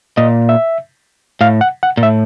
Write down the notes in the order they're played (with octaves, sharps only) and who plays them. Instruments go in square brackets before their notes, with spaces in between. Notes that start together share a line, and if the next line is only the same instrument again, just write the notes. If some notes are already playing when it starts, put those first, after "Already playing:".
[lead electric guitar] A#2 [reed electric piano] D#5
[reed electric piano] E5
[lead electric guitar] A2 [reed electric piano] F5
[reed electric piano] F#5
F#5
[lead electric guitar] A#2
[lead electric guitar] A2 [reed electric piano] E5